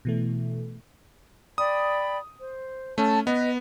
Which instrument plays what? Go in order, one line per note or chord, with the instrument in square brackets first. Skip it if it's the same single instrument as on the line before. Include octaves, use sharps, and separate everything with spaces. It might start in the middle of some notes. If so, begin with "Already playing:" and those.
[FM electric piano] B2 E3 A3
[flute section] D5 G5 B5 [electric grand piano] D#6
[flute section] C5
[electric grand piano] A3 C#4 [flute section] A5
[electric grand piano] B3 [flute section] B4 D#5